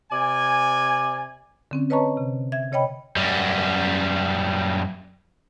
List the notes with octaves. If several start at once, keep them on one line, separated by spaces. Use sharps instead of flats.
C3 D5 G#5
D3 C4 C#4
B4 C#5 D#5 A5 A#5 C#6
C3
E5 G#6
C3 C#5 D#5 G5 B5
F#2 G3